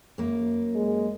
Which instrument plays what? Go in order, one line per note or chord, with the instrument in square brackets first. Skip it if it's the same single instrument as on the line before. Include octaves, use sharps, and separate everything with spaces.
[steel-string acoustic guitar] F#2 A#3
[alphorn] G#3